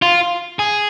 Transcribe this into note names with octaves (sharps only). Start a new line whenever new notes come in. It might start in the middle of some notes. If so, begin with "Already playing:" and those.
F4
G#4